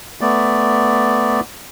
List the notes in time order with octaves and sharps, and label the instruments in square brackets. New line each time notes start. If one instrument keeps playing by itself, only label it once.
[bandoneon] A3 B3 D5